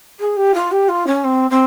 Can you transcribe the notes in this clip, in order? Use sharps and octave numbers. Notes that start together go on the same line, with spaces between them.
G#4
G4
F4
G4
F4
C#4
C4
C4